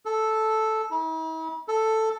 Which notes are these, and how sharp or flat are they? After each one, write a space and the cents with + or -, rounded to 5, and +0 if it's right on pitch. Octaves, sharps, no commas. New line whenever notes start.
A4 -5
E4 -45
A4 +5